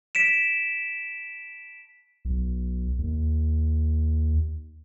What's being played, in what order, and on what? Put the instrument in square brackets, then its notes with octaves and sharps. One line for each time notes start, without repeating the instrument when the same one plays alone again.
[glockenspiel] B6 D7 E7
[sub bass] B1
D#2